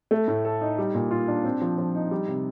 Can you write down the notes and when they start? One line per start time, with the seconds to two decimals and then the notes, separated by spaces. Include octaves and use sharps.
0.11 A3
0.28 A2
0.45 A4
0.61 D#4
0.78 G3
0.95 A#2
1.11 F4
1.28 D4
1.44 C4
1.61 F3
1.78 F3
1.95 D#4
2.11 G3
2.28 C3